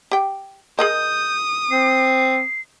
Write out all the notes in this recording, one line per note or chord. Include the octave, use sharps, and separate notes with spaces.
G4 G5
G#4 A#4 D#5 D#6 G6
C4 C7